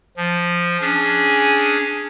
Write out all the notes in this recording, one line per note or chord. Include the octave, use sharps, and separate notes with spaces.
F3
C#4 D4 G#4